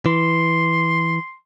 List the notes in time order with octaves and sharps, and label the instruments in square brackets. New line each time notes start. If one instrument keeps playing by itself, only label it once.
[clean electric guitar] E3 [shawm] C6